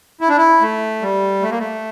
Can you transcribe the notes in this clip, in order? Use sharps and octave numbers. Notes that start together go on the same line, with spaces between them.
E4
D4
E4
A3
G3
A3
A#3
A3